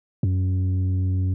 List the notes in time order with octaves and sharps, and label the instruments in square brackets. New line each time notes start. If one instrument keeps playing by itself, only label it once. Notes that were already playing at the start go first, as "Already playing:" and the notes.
[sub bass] F#2